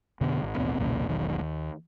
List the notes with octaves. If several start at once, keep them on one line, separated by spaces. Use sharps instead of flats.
F2 B2 D3 B3
G#1
A1 D#2 B2 C4
B1 E2 A#2 C#3
E1 B1 D#3
D#2